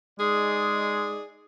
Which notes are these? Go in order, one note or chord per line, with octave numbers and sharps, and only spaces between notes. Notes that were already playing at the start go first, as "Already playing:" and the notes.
G#3 D#4 G#4 D5